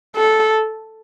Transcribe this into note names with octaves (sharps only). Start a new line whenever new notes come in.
A4